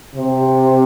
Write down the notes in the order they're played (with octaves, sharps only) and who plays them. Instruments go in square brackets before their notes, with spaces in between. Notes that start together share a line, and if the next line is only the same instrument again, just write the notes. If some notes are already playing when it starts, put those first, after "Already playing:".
[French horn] C3